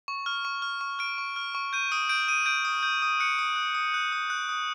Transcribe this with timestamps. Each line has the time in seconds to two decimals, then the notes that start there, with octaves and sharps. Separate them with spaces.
0.08 C#6
0.26 F6
0.45 C#6
0.62 F6
0.81 C#6
0.99 F6 D7
1.18 C#6
1.36 F6
1.55 C#6
1.73 G6 D#7
1.92 D#6 D7
2.09 G6 D7
2.28 D#6 D#7
2.46 G6 D7
2.65 D#6
2.83 G6
3.02 D#6
3.20 F#6 C#7
3.39 D#6
3.56 F#6
3.75 D#6
3.94 F#6
4.12 D#6
4.30 F#6
4.49 D#6